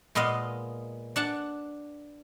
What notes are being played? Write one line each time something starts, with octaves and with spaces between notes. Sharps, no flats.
A#2 G#3 B3 D#5 F5
D4 F#5 A5